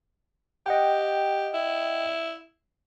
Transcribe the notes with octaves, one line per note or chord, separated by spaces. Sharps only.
G4 D#5 F#5 G5
E4